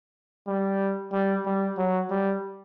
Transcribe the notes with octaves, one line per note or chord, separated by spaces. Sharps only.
G3
G3
G3
F#3
G3